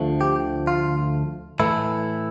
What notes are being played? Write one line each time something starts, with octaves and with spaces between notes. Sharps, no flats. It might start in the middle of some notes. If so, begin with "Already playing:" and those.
Already playing: D2 D3 F3 A3
G4
F4
A2 E3 A3 E4